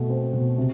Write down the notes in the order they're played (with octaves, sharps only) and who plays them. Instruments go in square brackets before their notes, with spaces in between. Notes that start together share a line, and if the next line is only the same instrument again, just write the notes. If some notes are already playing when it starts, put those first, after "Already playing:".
Already playing: [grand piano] B2 A3
C4
B2
C3